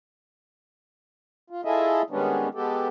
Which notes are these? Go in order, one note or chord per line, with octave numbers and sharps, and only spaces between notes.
F4
E4 F4 G#4 A4 D#5 E5
D#3 G3 G#3 B3 C#4 D4
G#3 B3 G4 A4